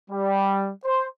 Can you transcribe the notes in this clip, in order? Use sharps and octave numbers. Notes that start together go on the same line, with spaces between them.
G3
C5